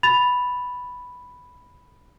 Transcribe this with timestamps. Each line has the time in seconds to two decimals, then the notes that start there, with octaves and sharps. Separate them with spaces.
0.03 B5 A6 F7